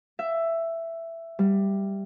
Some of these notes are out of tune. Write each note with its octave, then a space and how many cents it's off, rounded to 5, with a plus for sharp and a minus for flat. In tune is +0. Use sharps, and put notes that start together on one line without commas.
E5 +10
G3 +5